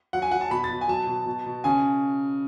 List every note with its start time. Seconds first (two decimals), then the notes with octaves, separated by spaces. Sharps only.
0.13 F#3 F#5
0.22 G#5
0.31 F#3 F#5
0.41 A5
0.50 B2 B5
0.64 A6
0.70 B2
0.81 G#5
0.88 F#3 A5
1.07 B2
1.26 B2
1.46 B2
1.64 C#3 G#5